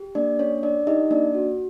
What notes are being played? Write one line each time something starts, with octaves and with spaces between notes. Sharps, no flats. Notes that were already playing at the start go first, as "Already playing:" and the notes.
Already playing: G4
A#3 D4 D5
C#4 D4 C#5
D4 D5
D#4 G4 D#5
A#3 D4 D5
F#4